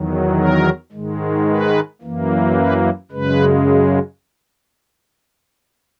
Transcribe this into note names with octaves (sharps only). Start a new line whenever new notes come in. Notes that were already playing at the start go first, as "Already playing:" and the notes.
Already playing: E2 D#3 F#3
A#4
G#2 D#3 G#3
B4
F#2 E3 A#3
B4
F#2 C#3 G#3 B4